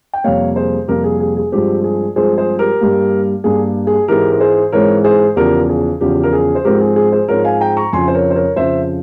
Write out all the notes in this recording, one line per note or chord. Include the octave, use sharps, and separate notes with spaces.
G5
F2 C3 G3 A#3 C#5 F5
G#4 C5
F2 C3 G3 A#3 G4 A#4
G#4
G#4
G#4
G2 F3 G#3 C4 G4
G#4
G2 F3 G#3 C4 G#4 C5
G#4 C5
G4 A#4
G2 G3 A#3
G2 G3 A#3 G#4
G#4
G#2 E3 G#3 C4 G4 A#4
A#4
G#4 C5
G#2 E3 G#3 C4 A#4 C#5
G#4 C5
E2 C#3 F3 G4 A#4
G#4
E2 C#3 F3 G4
A#4
G#4
C5
G#2 F3 G#3 C4 G4 A#4
G#4
G#4
G#4 C5
G#2 F3 G#3 C4 A#4 C#5
F5 G#5
G5 A#5
A#5 C#6
F2 C#3 F3 G#5 C6
C5
A#4 C#5
C5
A#4 C#5
F2 C#3 F3 C5 E5